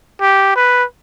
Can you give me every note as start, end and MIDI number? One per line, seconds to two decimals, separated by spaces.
0.21 0.53 67
0.56 0.84 71